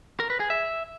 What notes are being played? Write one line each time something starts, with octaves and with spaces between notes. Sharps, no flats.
A#4
B4
G#4
E5